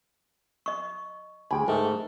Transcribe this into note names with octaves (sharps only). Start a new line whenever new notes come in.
D#5 C#6
D2 G#4 G5 G#5 B5
G#2 A3 A#4